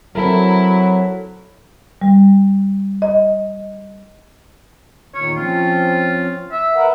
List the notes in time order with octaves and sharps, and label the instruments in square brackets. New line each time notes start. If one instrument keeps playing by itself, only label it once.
[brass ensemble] F#3 [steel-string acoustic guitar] C4 A4 A#4 [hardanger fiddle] E4
[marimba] G3
D#5
[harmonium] E2 A#2 D#3 [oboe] C#5
[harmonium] F3 C4 C#4 [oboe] F4
[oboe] E5
[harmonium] A#4 B4 F#5